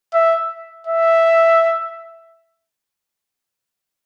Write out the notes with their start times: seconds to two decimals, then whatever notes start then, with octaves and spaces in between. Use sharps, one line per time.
0.14 E5
0.87 E5